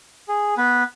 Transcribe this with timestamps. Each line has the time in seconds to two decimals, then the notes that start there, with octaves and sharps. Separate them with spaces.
0.29 G#4
0.58 B3 B4